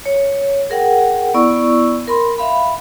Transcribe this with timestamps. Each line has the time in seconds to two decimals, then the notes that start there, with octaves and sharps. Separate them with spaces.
0.06 C#5
0.70 G#4 A#4 F#5 G5
1.34 B3 E4 D5 C#6 E6
2.07 A#4 B5 C6
2.38 E5 F5 B5